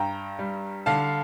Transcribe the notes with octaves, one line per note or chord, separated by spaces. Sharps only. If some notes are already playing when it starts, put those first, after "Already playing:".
Already playing: G2 G5 A#5
G3
D3 F5 A5